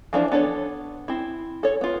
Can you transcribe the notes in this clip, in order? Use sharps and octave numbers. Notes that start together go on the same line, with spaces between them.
E3 F3 D4 C5
B3 D4 A4 C#5
C4 E4
A4 C#5
B3 F4